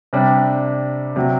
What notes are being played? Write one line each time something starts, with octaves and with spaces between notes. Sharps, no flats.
C3 G3 D4
C3 F#3